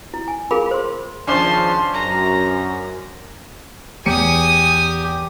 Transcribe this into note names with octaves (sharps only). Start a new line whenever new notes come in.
E4
G#5
F4 G#4 A#4 F5 B5
C5 C6
D#2 C#3 F3 C#4 D4 C5 A5 C6
F#2 A#5
E2 G4 G#5 D#6 C#7 D#7